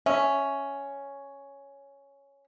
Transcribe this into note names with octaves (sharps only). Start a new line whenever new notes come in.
C#4 E5